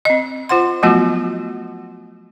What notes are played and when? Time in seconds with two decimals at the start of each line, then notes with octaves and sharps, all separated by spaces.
0.05 C4 D#5
0.49 F4 C5 F#5 C6
0.83 F3 F#3 A3 B3 F4 F#4